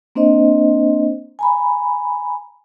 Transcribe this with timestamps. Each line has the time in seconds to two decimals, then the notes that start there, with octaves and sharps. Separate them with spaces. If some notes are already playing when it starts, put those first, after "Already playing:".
0.15 A#3 C4 D4 C5 D#5
1.39 G#5 A#5 B5